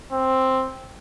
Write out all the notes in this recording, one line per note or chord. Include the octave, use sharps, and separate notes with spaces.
C4